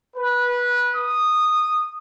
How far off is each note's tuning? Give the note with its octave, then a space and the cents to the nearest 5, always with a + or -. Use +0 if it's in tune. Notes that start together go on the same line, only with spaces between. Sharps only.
B4 -20
D#6 -10